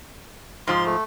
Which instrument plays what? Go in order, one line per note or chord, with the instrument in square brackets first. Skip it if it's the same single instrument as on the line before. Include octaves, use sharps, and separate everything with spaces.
[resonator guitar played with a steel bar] G#2 F3 [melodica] C6
[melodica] A3